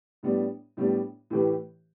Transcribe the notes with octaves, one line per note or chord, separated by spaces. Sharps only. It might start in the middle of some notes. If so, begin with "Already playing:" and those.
A2 G3 B3 D4
A2 G3 B3 D4
A2 E3 A3 G4 B4